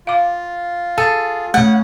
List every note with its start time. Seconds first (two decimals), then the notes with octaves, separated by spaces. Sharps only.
0.07 F4 F5 D6
0.98 G#4 A4
1.54 C#3 A3 C#4 F#5